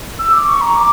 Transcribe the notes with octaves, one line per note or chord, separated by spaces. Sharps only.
E6
D6
C#6
A#5
D6